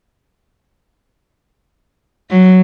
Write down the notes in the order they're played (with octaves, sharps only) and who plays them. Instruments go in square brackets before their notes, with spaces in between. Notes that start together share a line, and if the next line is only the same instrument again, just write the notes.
[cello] F#3